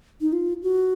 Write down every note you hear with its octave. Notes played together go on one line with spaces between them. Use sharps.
D#4
F4
F#4